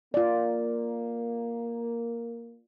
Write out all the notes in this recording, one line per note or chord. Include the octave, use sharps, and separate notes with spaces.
A#3 F4 D5